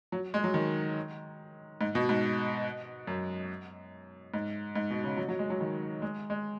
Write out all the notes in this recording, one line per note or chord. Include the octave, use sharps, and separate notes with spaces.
F#3
G#3
F#3
D#3
G#2
B2
G#2
F#2
G#2
G#2
B2
C#3
F#3
F#3
G#3
F#3
D#3
G#3
G#3